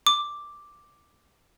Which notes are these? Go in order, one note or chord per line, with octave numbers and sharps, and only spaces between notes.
D6